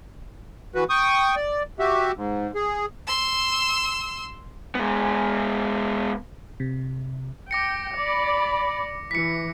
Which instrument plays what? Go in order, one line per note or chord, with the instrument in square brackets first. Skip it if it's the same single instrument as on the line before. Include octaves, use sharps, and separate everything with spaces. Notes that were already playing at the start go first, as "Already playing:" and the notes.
[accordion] E3 F#4 B4
G5 C#6 D#6
D5
F#4 G4 E5
G#2
G#4
[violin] C6 E6
[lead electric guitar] G#3 B3
[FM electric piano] C3
[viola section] G5 [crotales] D6 A#6 C#7
[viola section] D5 B5
[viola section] E3 [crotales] B6 C#7